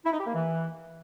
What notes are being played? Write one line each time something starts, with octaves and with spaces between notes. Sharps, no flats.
E4
D#4
G4
A#3
E3